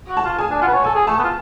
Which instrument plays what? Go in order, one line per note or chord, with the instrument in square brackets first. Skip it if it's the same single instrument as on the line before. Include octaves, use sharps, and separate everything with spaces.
[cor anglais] F#4
[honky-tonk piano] A5
[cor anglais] F4
[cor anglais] G#4 [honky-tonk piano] G#5
[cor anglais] D4
[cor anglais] F4 [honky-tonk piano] F#5
[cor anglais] B4
C#5
[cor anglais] A4 [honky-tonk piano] G#5
[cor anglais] G#4
[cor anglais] A3 [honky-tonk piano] A5
[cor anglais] B3
F4